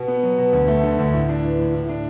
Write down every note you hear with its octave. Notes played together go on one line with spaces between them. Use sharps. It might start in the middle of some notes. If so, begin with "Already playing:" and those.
Already playing: B2
B3
F#3
B2
D2
A3
D3
D2
A2
D4
E3
A2
A2
D4